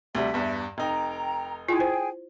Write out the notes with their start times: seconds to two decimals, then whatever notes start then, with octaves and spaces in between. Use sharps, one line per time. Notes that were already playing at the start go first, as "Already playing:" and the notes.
0.15 D2 C3 G3 E5
0.34 E2 G2
0.78 F1 D#4 G5 A#5
1.69 E4 F4 G#4 G5 G#5
1.80 C5